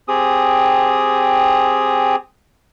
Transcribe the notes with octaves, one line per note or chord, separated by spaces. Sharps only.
C4 G4 G#4 D#6